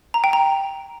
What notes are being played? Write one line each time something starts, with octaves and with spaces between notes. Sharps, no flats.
A#5
G5
A#5